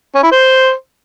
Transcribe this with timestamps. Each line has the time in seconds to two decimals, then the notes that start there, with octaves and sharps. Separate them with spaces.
0.15 C#4
0.23 E4
0.31 C5